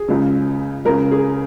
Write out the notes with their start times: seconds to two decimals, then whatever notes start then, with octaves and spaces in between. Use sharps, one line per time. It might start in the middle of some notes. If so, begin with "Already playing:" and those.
Already playing: G#4
0.08 C#2 C#3
0.85 C#2 C#3 A#4
1.11 G#4